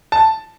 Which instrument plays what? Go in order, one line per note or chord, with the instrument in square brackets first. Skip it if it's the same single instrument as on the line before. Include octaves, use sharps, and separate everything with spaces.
[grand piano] A5